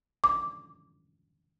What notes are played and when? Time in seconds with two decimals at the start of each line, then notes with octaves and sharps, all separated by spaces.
0.24 D6